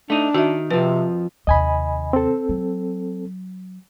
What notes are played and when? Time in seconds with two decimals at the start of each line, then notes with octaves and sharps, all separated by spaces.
0.10 A3 D4 D#4
0.34 D#3 F#4 E5
0.71 F2 C3 F3 B4
1.47 D#2 C3 D#5 G#5 B5
2.13 C4 A4
2.49 F#3